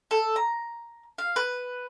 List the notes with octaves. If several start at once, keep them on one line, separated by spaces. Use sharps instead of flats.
A4
A#5
F5
B4